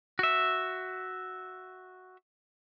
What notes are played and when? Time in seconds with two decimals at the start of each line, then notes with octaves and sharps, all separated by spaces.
0.19 F#4 E5